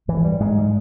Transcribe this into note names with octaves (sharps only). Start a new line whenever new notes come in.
G#2 E3
G3
G#2 G#3